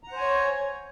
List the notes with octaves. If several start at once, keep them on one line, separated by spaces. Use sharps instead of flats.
C5 C#5 F#5 G#5 A#5